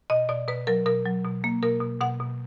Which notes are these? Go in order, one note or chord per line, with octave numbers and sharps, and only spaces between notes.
B2 D#5
B2 D5
B2 B4
F#3 A#4
B2 A#4
F#3
B2
A#3
B2 A#4
B2
B2 F#5
B2